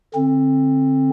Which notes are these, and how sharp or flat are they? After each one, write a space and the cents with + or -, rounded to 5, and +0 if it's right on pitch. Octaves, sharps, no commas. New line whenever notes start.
D3 -5 C4 +20